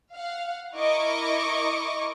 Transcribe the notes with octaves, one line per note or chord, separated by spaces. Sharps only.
F5 F#5
E4 A#4 D#5 C#6 D6